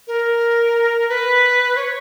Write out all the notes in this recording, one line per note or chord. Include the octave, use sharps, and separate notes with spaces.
A#4
B4
C#5